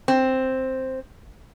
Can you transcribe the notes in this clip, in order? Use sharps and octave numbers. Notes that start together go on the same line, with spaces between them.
C4